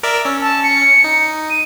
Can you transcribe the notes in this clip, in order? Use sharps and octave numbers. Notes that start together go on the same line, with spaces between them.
A#4 D5 E5
C#4 E6
A5
C#7
D#4
D#7